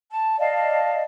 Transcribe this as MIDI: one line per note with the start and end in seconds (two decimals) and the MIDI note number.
0.10 0.38 81
0.39 1.03 74
0.39 1.03 75
0.39 1.03 77
0.39 1.03 81